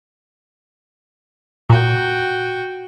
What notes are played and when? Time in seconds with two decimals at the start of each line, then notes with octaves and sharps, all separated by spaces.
1.70 A#2 F#4 G5